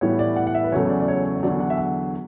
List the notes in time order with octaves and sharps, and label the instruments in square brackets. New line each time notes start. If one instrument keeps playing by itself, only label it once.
[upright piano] A2 E3 G3 B3 C#5
D5
F#5
F#5
E5
B4
E2 C#3 F#3 A3 C#5
D5
D5
C#5
C#5
C#5
E2 D3 F#3 D5
F#5
E5
F#5